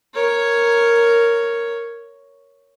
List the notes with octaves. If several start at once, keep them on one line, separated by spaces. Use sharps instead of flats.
A#4 C#5